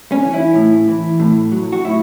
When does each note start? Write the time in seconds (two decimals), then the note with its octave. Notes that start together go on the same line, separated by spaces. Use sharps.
0.12 C#4
0.22 E3
0.34 E4
0.55 A2
0.88 E3
1.20 A2
1.52 F#3
1.73 F#4
1.84 A2 E4